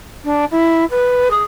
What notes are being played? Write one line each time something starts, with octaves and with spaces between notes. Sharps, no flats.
D4
E4
B4
G#4